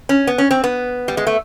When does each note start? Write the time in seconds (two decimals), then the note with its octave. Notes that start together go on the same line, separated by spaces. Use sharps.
0.09 C#4
0.27 B3
0.38 C#4
0.51 C4
0.64 B3
1.08 G3
1.17 G#3
1.27 A3